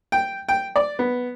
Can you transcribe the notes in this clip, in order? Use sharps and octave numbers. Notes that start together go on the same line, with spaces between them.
G5
G5
D5
B3